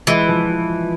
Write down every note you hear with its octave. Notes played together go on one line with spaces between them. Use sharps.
E3 G#3
F3